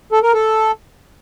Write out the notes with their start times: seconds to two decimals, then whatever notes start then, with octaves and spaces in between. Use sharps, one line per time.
0.12 A4
0.23 A#4
0.34 A4